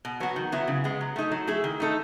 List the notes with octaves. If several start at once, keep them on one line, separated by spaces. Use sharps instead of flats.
B2
F#3 B3 F#4
D#3
F#3 B3 E4
C#3
G#3 B3
F#3
A3 D#4 A4
F#3
A3 E4 G#4
D#3
A3 D#4 A4